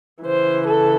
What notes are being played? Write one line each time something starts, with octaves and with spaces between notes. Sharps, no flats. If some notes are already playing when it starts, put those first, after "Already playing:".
C#3 E3 C5
A4